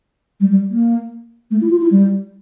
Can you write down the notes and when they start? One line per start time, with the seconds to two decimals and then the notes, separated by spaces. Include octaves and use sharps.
0.40 G3
0.50 G3
0.70 A#3
1.51 A3
1.61 E4
1.71 F4
1.81 E4
1.91 G3